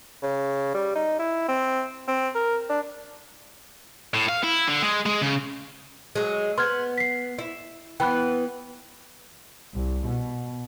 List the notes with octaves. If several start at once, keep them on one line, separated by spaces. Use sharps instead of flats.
C#3
G3
D#4
E4
C4
C4
A#4
D4
A2
F5
E4
D3
G#3
G#3
C#3
F#3 G#3
B3 C6 F6 G#6
B6 C7
E4
E3 B3 G5 B5 F#6
C2
B2